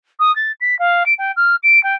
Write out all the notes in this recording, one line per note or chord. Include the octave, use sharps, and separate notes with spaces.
D#6
A6
B6
F5
D7
G5
F6
D7
G5